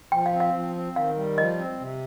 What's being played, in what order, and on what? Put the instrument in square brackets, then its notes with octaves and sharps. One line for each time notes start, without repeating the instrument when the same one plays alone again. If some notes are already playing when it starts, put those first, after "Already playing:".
[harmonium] F3 [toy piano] G5
[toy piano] F5
[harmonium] C4
[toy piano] F5
[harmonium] F3
C4
[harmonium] D#3 [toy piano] F5
[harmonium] G3
[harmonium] F3 [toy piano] D#5
[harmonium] C4
C3